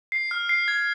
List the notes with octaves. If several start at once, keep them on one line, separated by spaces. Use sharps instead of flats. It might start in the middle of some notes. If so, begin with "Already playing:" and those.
C7
F6
C7
G#6